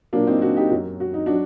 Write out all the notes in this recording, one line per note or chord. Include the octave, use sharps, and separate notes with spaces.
A#2 F#3 A#3 D4
C4 D#4
D4 F#4
D#4 G4
F#2 F#3
F#4
D#4
F#3 D4 F#4